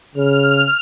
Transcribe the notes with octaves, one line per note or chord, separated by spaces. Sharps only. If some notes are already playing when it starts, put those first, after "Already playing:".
C#3 F6